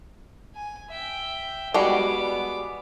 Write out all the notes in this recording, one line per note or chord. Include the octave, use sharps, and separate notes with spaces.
G#5
E5 G5
G3 G#3 B3 F#4 D6